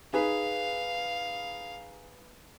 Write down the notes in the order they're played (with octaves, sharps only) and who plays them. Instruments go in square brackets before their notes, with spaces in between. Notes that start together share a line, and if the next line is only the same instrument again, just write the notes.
[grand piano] D#4 G#4 B4 [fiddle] F5